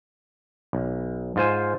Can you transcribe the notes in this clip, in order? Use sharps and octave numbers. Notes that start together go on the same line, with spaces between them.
B1
G#2 F4 C5 G#5